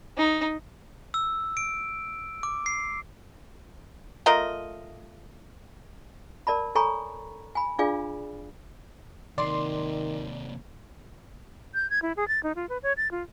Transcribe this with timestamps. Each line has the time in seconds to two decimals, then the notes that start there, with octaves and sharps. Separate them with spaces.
0.17 D#4
1.14 E6
1.57 D7
2.43 D6
2.66 C7
4.26 A3 F4 A#4 D#5
6.47 A#4 D5 A5 B5
6.75 A4 C#5 G#5 A#5 B5 C#6
7.55 G#5 B5
7.79 D4 F4 G#4 D5 F5 G#5
9.38 D#2 C3 D#3 D5 C6
11.74 G6
11.90 G#6
12.02 E4
12.17 G#4
12.28 A6
12.43 D#4
12.56 F4
12.69 B4
12.83 C#5
12.97 A6
13.11 F4